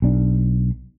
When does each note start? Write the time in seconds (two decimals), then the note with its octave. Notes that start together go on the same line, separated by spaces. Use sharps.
0.02 B1 D4